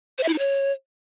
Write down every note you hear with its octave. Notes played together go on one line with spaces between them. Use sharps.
C5
E5
E4
D#4
C#5